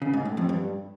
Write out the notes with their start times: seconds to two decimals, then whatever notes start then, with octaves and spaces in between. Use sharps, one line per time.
0.02 C#3
0.13 G#2
0.25 A2
0.37 F2
0.49 G2